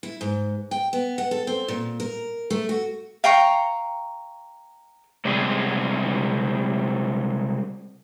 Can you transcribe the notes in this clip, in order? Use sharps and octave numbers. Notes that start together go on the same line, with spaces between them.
E4
G#2
G5
B3
F#5
A4
C4
A#2
A#4
A3
F#4
F5 G5 A#5 C#6
C3 G3 G#3 C4 G#4